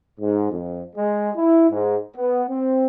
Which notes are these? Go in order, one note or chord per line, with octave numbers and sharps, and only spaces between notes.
G#2
F2
G#3
E4
G#2
B3
C4